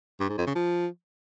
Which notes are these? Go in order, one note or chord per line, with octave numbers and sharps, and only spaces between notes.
G2
G#2
F2
C#3
F3